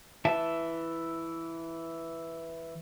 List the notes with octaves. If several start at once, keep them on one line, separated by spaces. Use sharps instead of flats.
E3 E5 A5